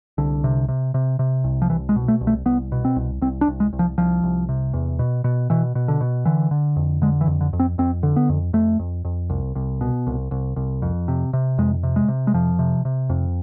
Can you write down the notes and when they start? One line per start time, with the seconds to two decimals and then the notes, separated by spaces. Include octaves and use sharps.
0.18 C2 D3
0.44 C3
0.68 C3
0.94 C3
1.19 C3
1.44 C2
1.62 F3
1.70 C2 E3
1.89 G#3
1.96 B2
2.08 A3
2.21 C2
2.27 A3
2.45 C2 B3
2.72 B2
2.85 C4
2.96 C2
3.21 C2 C4
3.41 D4
3.48 C2
3.60 G#3
3.73 C2
3.79 F3
3.98 C2 F3
4.24 C2
4.49 C3
4.73 E2
4.99 B2
5.24 B2
5.50 B2 E3
5.75 B2
5.88 D3
6.01 B2
6.25 D3 E3
6.51 D3
6.76 F2
7.02 D3 G#3
7.21 E3
7.27 F2
7.41 D3
7.53 F2
7.60 C4
7.78 F2 C4
8.03 D3
8.16 B3
8.29 F2
8.53 F2 A3
8.79 F2
9.05 F2
9.30 C2
9.55 C2
9.81 B2
10.07 C2
10.31 C2
10.56 C2
10.82 F2
11.08 C3
11.33 C3
11.58 F2 G#3
11.83 C3
11.96 G#3
12.08 C3
12.27 G#3
12.34 F2 F3
12.59 C3
12.85 C3
13.10 F2